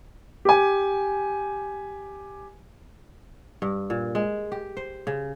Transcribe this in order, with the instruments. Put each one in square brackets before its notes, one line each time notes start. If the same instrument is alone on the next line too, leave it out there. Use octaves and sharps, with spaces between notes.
[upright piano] G4 G#5
[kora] G2
A#2
G#3
G4
C5
C#3